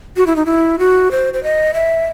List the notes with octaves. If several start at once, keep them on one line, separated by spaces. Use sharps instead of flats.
F#4
E4
D#4
E4
F#4
C5
C5
D#5
E5